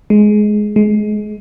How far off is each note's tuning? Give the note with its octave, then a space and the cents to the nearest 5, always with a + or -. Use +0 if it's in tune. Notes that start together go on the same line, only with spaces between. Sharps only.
G#3 +15
G#3 +25